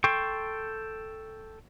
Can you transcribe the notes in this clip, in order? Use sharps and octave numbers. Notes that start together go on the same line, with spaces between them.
A4 G5 C6 C#6